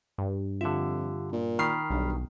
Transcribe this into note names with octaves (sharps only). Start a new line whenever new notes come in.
G2
F2 D3 F4 G4 E5
A#2
D#3 B5 F6 C7
B1 G2